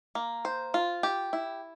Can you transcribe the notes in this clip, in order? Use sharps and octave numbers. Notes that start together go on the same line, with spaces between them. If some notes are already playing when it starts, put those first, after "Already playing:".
A#3
C5
F4
G4
E4